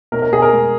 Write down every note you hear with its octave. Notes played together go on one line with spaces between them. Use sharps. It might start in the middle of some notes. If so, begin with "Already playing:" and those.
B2 A#4
A#4
B2 G#4
A#4
G#3